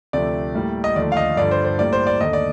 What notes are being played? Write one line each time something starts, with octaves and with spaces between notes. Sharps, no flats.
D2 C3 F3 A3 D5
A2 G3 A#3
D#5
D#2 D3 F3 A3 D5
F5
D#5
G2 D3 F3 D5
C5
C5
A2 G3 A#3 D5
C5
D5
D#2 D3 A3 D#5
D5